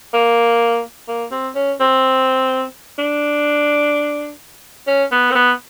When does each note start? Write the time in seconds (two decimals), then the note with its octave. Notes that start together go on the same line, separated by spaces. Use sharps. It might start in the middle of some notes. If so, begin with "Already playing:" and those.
0.14 A#3
1.08 A#3
1.31 C4
1.56 C#4
1.80 C4
2.98 D4
4.87 C#4
5.12 B3
5.31 C4
5.35 B3